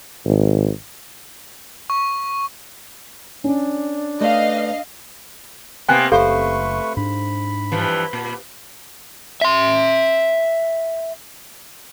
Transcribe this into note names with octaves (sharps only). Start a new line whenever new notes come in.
G#1
C#6
C#4 D4
A3 B4 D5 D#5 F5
C3 A#3 B3 G5 G#5 F#6
F#1 A3 G4 A4 B4 C5 F5 C#6
G#2 D4 B5
G2 E3 F3
A#2
E5 C6